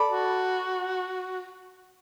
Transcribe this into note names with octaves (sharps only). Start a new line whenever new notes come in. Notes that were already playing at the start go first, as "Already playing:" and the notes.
Already playing: A4 D5 B5
F#4